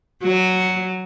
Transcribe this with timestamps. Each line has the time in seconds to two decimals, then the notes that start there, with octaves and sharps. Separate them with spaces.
0.23 F#3